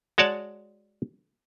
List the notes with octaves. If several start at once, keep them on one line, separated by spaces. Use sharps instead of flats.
G#3 F#4 C#5 D5 A5